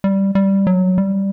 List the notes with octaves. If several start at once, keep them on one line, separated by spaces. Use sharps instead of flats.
G3
G3
F#3
G3